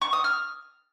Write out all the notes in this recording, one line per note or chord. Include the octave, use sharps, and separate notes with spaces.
C#6
D#6
F6